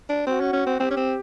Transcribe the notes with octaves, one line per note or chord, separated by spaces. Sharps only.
D4
C4 F#4
C#4
C#4
C4
C4 G4
C#4
C4